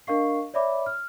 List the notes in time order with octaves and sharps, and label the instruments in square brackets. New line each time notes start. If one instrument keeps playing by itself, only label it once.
[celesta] D4 A#4 D#5 F5 C#6 C7
C#5 D5 E5 B5 D6
F6